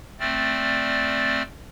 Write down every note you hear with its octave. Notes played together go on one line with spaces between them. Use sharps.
A3 C4 D5 F6